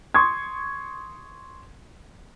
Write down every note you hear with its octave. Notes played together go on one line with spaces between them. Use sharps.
C6 C#6 D#6 G#6